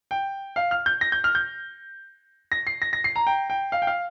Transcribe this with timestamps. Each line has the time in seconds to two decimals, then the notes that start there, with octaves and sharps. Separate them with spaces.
0.11 G5
0.56 F5
0.71 F6
0.86 G6
1.01 A#6
1.12 G6
1.24 F6
1.35 G6
2.52 A#6
2.67 C7
2.82 A#6
2.93 A#6
3.04 C7
3.16 A#5
3.27 G5
3.50 G5
3.72 F5
3.82 G5
3.87 F5